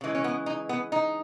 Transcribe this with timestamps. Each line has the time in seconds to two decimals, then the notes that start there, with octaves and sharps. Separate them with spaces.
0.01 C#3 E3 G#3
0.15 C#4
0.24 B3
0.46 D#4
0.69 B3
0.92 D#4